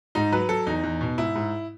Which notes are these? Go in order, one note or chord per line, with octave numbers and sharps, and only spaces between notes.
G#2 D#4
F#3 B4
F#3 A4
E2 D#4
E2
B2
G#2 E4
G#2